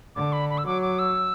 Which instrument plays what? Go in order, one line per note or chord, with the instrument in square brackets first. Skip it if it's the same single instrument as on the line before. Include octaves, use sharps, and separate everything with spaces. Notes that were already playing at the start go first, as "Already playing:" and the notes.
[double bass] D3 [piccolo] D6
[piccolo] B5
B5
E6
[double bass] F#3 [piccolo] D6
[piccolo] D6
E6